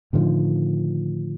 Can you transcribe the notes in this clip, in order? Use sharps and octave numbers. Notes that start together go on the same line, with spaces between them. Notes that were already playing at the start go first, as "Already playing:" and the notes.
A2 D3 D#3 F3